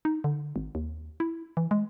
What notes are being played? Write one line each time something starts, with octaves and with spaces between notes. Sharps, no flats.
D#4
D3
G#1
D#2
E4
E3
G#3